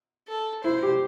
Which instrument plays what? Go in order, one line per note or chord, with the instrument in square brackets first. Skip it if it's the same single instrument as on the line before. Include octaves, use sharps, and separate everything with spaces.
[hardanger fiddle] A4
[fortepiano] E4 [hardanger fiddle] C5
[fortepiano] G4